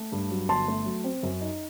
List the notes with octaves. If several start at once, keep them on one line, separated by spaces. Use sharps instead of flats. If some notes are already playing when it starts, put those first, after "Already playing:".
Already playing: A3
G2
F#3
G1 A5 C6
A3
F#3
C4
F#2
D#4